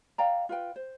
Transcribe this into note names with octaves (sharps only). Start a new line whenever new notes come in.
D5 F5 G5 A#5
F4 B4 G5
C5